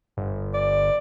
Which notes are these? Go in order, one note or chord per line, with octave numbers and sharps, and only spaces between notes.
G1
D5